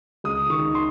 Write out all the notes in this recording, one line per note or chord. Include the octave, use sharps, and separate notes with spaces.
C#2 D#6
D#3 C#6
C6